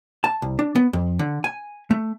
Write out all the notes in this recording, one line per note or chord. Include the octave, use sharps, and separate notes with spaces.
A5
C2
D4
B3
F2
D3
G#5
A3